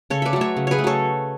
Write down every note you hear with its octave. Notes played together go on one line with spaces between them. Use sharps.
C#3 A4 C#5
B4 D5 E5
F#3 A3
C#5 E5
C#3
G#4 B4 C#5
A3
F#3 A4 C#5